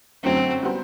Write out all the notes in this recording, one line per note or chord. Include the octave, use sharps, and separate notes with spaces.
F#2 D3 F#3 A3 C4
G3 B3 F#4 C5